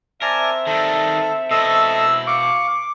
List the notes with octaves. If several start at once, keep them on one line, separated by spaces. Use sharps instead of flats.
C4 A#4 D5 E5 G#5 A5
D#3 G3 A4
B2 E4 A4 D#5 E6
F5 C#6 D6